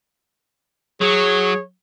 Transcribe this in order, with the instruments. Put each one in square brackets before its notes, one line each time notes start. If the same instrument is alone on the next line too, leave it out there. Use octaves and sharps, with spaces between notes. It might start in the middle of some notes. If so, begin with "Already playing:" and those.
[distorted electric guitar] F#3 [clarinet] G#4 [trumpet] C#5